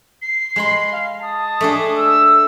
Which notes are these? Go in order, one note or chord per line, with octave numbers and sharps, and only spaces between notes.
C7
G#3 B5 C6
F5
A5 D#6
A3 D4 G#4
E6